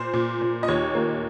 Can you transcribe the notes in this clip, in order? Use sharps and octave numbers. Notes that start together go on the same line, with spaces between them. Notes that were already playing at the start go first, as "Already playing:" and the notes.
Already playing: A#2 C5
A#2
A#2
D#5
D#2 C#5
A#3